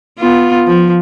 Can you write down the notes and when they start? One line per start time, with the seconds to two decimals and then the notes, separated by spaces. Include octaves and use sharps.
0.18 B3 F4
0.67 F3